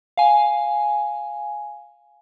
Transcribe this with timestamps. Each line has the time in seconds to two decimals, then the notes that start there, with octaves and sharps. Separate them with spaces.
0.17 F5 G#5